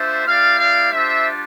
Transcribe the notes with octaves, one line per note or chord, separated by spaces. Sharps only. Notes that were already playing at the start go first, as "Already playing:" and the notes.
Already playing: A3 D4 F4 C5 E5
A#3 E4 G4 D5 F5
D5 F5
G3 D4 F4 C5 E5